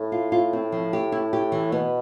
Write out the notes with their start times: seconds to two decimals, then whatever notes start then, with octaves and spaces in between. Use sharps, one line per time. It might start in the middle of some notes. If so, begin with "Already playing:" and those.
Already playing: A2
0.12 F4
0.32 F4
0.53 C4
0.72 F3
0.93 G4
1.12 E4
1.33 G4
1.52 E3
1.72 B2 B3